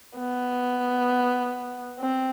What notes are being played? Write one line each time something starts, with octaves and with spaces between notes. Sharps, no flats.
B3
C4